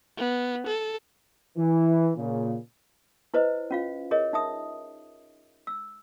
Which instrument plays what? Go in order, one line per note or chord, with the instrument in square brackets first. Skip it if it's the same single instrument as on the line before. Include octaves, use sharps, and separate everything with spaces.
[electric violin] B3
A4
[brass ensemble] E3
A#2 C#3
[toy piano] E4 B4 C5 D#5
C#4 F4 F5
G#4 A#4 C#5 D#5
D#4 E5 D#6
E6